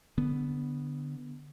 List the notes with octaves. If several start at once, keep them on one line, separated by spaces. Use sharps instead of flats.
D3 B3